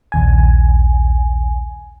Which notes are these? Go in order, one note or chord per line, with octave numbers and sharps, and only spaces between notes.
A#1 D#2 G#5